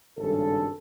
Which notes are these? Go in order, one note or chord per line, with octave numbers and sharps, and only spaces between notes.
G#1 G2 C#3 A4